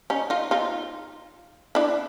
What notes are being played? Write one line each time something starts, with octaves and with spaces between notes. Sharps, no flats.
C#4 D#4
D#4 F4
D#4 F4
D4 E4